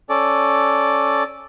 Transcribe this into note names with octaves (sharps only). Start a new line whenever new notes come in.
C#4 A4 D5